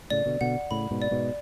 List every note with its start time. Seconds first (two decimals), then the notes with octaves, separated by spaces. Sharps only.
0.10 A2 C#3 D5
0.26 B2 D3
0.41 B2 D3 F#5
0.71 A2 C#3 B5
0.91 G#2 B2
1.02 D5
1.11 G#2 B2